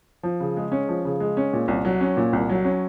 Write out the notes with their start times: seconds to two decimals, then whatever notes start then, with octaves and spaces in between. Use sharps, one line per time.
0.23 F3
0.40 C#3
0.57 G#3
0.72 C#4
0.89 F3
1.05 C#3
1.20 G#3
1.37 C#4
1.53 A#2
1.68 C2
1.85 F#3
2.01 C#4
2.17 A#2
2.33 C2
2.50 F#3
2.65 C#4